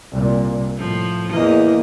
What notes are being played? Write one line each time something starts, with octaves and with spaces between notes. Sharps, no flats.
C2 A#2
A2 F3
E2 E3 A#3 D#5